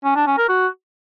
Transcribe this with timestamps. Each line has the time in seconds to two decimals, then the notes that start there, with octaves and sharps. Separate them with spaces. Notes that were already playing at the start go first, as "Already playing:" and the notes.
0.04 C#4
0.15 D4
0.26 C#4
0.37 A#4
0.49 F#4